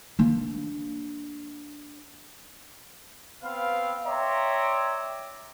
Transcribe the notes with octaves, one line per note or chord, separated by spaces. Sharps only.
A#3 D4
B3 C4 B4 F5
C#5 D5 E5 G5 A#5 C6